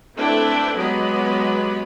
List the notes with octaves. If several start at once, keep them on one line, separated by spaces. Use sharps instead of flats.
A3 C4 D4 E4 B4 G5
F#3 G#3 B3 G4 D#5 B5